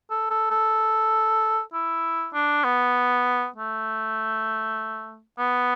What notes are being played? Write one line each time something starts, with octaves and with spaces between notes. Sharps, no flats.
A4
A4
A4
E4
D4
B3
A3
B3